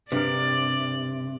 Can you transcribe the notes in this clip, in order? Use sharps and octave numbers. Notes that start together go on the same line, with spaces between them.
G2 C3 A#4 D5